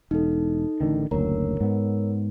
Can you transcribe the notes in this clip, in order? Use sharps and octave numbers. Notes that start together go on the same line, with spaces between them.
E1 D#4 A4
A1 D3 D#3
F#1 D2 A#4 C#5 A#5
G#2 B3